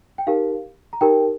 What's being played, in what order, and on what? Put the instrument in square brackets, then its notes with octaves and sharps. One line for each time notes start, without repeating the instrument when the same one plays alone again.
[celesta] G5
D#4 G4 A#4 F5
A#5
D#4 G4 A#4 G5